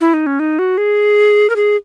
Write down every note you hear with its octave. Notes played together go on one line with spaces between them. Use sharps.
E4
D#4
C#4
D#4
F#4
G#4
A#4
G#4